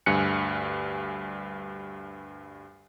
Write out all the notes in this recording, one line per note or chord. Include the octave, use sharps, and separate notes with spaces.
D2 G2 G#5 F#6 C#7